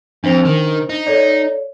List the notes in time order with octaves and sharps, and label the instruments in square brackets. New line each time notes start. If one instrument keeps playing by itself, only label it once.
[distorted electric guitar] F2 [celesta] D4 C5 F7
[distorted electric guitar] D#3
D#4
[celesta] A4 C#5 D5